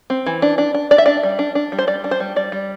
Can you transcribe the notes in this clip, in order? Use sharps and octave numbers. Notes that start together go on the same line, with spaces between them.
C4
E3
D4
D4
D4
D4 D5
E5
D4 D5
G3
D4
D4
G3
C5
G3 D5
D4
C5
G3
G3 D5
G3